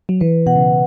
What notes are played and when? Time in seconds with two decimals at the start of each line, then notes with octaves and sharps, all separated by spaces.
0.09 F#3
0.21 E3 B4
0.46 B2 F#5
0.56 C#3